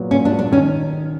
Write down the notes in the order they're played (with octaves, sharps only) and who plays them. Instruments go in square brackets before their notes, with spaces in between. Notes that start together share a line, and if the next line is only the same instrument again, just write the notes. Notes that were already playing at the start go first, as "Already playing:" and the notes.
Already playing: [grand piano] A#2 F#3 B3
[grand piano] A#2 [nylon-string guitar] C#4
[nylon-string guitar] D4
[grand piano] F#3
[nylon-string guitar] D4
[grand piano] D#3 [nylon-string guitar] C#4